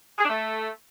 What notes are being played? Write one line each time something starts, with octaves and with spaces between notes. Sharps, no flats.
G#4
D4
A3